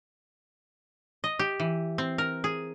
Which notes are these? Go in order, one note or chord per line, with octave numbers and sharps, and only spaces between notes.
D#5
G4
E3
C4
A#4
G#4